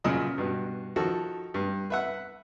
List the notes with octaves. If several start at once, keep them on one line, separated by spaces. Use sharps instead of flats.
F#2 A#2 C#3 D#5 D#6
G2 B2
D#3 F3 F#4 A4
G2
B4 E5 F#5